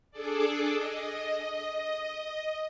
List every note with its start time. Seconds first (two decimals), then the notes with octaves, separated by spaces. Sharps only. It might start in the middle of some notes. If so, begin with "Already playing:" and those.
0.11 D4 G#4 A4 D5
0.75 D#5